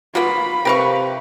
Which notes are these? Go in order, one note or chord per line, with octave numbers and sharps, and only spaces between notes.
F#3 A#3 B3 F4 B5
C3 G4 A#4 B4 F5 C#6